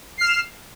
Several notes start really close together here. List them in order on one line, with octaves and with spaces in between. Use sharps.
C7 F6 E7